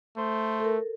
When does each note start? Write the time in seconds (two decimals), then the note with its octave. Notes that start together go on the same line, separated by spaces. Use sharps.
0.18 A3 C5
0.60 A4 A#4